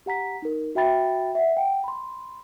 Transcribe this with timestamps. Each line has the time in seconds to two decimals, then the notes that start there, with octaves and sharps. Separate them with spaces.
0.06 G4 F#5 A#5 B6
0.42 D#4 A#4
0.75 F#4 E5 G5 B5 A6
1.35 E5 F#5
1.57 F#5 G5
1.84 B5 C6